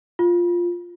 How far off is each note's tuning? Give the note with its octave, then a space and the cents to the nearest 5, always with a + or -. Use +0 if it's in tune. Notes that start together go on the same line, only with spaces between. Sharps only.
F4 +0